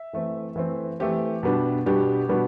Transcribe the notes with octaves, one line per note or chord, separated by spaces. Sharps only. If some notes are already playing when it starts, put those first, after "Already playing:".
Already playing: E5
E3 A3 C4
E3 A3 C4
E3 A3 C4 G4
B2 G3 B3 D4
B2 G3 B3 D4 G4
B2 G3 B3 D4